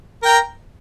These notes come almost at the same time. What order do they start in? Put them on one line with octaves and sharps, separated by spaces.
A#4 G5 A#5